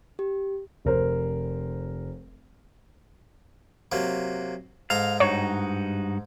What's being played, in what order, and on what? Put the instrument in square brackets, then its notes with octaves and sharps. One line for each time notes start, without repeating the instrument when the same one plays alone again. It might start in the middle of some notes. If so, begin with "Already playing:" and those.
[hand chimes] G4
[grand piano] F1 A#4 C5
[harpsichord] C3 F#3 A#3
[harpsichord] G#2 A4 A#5 [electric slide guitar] F5
[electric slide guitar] G2 D#4 F#4 [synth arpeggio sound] C#5